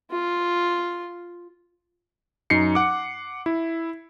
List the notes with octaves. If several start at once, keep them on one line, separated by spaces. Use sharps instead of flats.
F4
F#2 D#4 C7 C#7
F#5 D6
E4